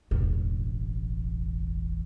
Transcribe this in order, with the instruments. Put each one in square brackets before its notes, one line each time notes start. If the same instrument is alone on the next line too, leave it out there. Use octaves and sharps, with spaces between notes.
[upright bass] E1 A1